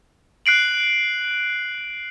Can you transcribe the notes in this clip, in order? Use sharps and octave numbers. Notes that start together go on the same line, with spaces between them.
F#6 C7 D7 F#7